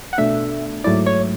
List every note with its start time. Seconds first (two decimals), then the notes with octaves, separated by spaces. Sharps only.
0.13 F#5
0.18 B2 A3 D4 E5
0.84 G#2 F#3 A3 E4 D5
1.06 C#5